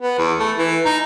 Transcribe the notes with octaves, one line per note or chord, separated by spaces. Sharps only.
B3
E2
A3
E3
D#4